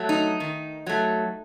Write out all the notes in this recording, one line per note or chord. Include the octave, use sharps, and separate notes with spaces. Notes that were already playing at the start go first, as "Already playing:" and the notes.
Already playing: F#3 A3
D#4
D#3
F#3 A3